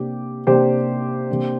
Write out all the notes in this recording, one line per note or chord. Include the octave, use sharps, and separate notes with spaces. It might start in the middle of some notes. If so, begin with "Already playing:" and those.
Already playing: C3 A#3 D4 G4
C3 A#3 D4 G4 C5
C3 A#3 D4